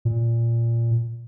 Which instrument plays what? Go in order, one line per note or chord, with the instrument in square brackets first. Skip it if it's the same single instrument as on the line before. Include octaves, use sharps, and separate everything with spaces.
[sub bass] A#2